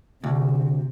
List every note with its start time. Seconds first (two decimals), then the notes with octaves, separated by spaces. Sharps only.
0.24 D2 C3